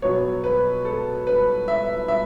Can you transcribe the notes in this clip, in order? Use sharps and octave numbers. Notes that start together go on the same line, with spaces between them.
B2 F#3 B3 C#5
B4
A4
B4
E5
E5